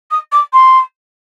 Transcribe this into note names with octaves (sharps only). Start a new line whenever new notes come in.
D#6
D6
C6